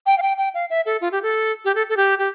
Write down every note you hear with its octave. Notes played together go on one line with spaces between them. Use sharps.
G5
F5
G5
G5
F5
E5
A4
F4
G4
A4
G4
A4
A4
G4
G4